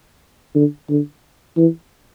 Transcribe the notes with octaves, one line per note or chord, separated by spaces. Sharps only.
D3
D3
E3